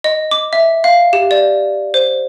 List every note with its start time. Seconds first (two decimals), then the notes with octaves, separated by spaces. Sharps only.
0.04 D#5
0.31 D6
0.53 E5
0.84 F5
1.13 G4
1.31 D5
1.94 C5